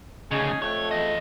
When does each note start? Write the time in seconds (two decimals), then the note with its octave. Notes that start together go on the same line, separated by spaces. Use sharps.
0.31 D2 C#3 C#4 D#4 G#4
0.62 F2 A3 C#5
0.91 E2 D#5